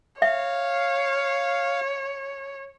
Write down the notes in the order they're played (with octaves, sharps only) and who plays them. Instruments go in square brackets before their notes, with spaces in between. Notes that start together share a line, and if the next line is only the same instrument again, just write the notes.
[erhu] C#5 [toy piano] E5 [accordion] F5